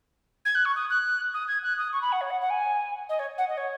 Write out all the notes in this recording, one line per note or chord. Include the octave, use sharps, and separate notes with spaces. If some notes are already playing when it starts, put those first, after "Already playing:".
G#6
F#6
C#6
D#6
F#6
D#6
G#6
F#6
D#6
C#6
B5
F#5
C#5
F#5
F#5
G#5
D#5
C#5
F#5
D#5
C#5